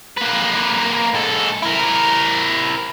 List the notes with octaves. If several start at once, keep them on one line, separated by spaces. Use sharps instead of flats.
A#3 B4
G#2 A4
E4 A#4